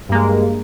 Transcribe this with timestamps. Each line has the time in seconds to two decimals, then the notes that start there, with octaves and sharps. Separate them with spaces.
0.09 G2
0.12 A#3
0.14 G#3